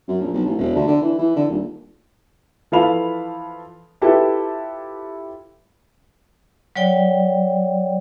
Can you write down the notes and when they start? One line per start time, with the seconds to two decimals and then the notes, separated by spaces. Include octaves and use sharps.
0.08 F#2
0.21 A#1
0.33 B1
0.46 A1
0.58 E1
0.75 D2
0.88 D3
1.01 E3
1.18 E3
1.36 D3
1.49 D#1
2.72 E3 F3 A4 F5 B5 F7
4.01 E4 F4 G4 A4 B4 A5
6.76 F#3 C#5 D5 G5